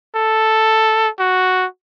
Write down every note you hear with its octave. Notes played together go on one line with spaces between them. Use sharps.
A4
F#4